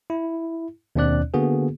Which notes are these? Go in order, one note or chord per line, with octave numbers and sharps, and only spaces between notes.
E4
D#2 B2 C4 D4 D5 F#6
D3 A#3 B3 F#4 G#4